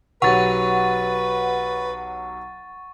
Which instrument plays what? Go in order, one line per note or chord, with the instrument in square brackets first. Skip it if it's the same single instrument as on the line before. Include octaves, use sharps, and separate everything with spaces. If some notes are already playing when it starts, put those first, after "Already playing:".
[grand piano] B1 F#3 G4 [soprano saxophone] B4 [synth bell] F#5 [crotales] C#6 A6